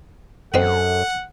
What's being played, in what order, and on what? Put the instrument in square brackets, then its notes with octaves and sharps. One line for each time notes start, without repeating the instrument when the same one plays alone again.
[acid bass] F#2 [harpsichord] C4 D#4 F#4 [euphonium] A4 [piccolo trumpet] F#5